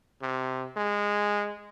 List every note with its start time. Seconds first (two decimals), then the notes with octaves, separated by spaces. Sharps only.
0.22 C3
0.77 G#3